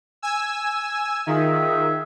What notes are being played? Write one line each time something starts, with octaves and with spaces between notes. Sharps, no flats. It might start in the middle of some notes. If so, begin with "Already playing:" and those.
G#5 E6
D#3 F4 G#4 E5